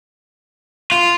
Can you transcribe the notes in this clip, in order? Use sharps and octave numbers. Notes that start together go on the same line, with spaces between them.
F4